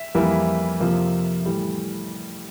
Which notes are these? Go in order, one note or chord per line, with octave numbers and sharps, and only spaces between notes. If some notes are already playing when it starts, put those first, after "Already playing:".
Already playing: E5
F2 E3 G3 A#3 E4
F2 C3 F3 A#3
A2 E3 G3